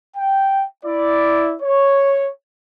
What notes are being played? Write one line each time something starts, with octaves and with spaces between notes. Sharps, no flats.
G5
E4 D5
C#5